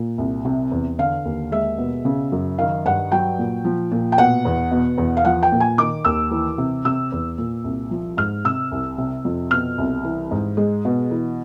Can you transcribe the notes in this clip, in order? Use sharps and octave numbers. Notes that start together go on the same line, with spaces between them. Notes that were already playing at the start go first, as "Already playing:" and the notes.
Already playing: A#2
C2
C3
E2
D3 F5
D#2
G#3 E5
B2
C#3
F#2
D#3 F5
G2 F#5
F#3 G5
A#2
F3
A#2
G5
B2 F#5
E2
B2
E2
F5
F3 F#5
G5
A#2
G#5
D#3 D6
D#2 E6
E3
C3
C3 E6
E2
A#2
C2
F3
G#2 F6
C3 E6
C2
C3
F2
B2 F6
C2
E3
G#2
G#3
B2
E3